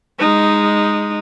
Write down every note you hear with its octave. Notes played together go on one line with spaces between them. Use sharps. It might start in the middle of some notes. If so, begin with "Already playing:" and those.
G#3 D#4